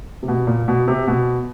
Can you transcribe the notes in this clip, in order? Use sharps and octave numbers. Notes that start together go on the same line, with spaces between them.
C3
B2
A#2
B2
C3
B2